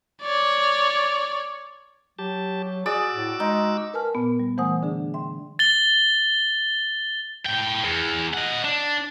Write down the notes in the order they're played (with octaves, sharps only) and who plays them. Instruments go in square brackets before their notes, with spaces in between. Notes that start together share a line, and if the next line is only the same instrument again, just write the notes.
[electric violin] C#5 D5
[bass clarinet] F#3 [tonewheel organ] G4 A5
[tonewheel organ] F#4 D6 E6 [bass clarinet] G#4 [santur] D5
[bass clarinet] A2
[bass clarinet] G#3 [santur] D#4
[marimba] A#4 B4 G#5 A5 F6
A#2 B3
G3
E3 A3 C5 F#5 G#5 D#6
D3 D4 G#4
E5 G5 C6
[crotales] A6 G7
[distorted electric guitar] A2 G5
E2
D#5 F#5
D4